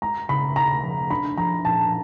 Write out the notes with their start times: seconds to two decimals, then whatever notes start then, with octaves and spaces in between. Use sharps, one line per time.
0.02 G#3 A#5
0.29 C#3 B5
0.56 D#2 A#5
0.83 F3
1.10 D4 B5
1.38 F3 A#5
1.65 A#2 A5